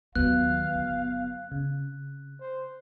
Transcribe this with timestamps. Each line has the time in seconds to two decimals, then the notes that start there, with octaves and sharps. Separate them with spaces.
0.15 D#2 D#3 F#3 B3 F5 F#6
0.75 G1
1.51 C#3 C4
2.40 C5